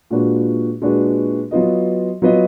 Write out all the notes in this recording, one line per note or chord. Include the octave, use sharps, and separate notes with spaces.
A#2 G#3 D4 F#4 B4
A#2 G#3 D4 F#4 B4
F#3 B3 F4 B4 D#5
F#3 B3 F4 B4 D#5